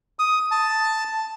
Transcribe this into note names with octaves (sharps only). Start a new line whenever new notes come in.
D#6
A5